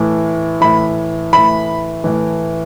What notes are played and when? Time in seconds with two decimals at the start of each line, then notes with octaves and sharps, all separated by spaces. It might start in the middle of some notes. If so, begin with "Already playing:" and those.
Already playing: A2 E3
0.61 A2 E3 B5
1.33 A2 E3 B5
2.04 A2 E3